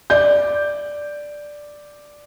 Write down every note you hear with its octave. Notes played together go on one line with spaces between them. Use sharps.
D5 G6